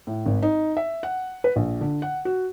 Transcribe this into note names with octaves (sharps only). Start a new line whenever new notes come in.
A2
G#1
D#4
E5
F#5
B4
A#1
D3
F#5
F#4